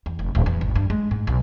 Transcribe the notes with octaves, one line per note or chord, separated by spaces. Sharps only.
E2
F1
D1
E2
G#1
G2
G#3
G#2
B1